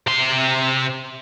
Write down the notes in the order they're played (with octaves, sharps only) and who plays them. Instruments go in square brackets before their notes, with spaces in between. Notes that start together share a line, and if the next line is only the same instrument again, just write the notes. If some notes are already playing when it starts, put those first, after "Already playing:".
[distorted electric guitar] C3 C6